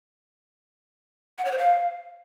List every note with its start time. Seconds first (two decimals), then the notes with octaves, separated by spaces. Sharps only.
1.38 F#5
1.45 C#5
1.52 C5
1.58 F5